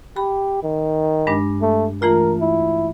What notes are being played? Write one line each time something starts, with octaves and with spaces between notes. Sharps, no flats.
G4 B5
D#3
G2 G#3 D4
A3
E3 A3 F4 A#4
E4